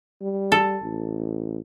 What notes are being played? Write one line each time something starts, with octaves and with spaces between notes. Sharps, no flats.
G3
A4
A1